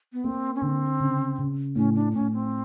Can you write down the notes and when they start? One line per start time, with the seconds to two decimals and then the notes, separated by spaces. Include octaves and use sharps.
0.13 B3
0.24 A#3 C4
0.55 C#4
0.62 D3 C4
1.00 C#3
1.38 C#3
1.76 A2 C#4
1.95 D4
2.14 A2 C#4
2.33 C4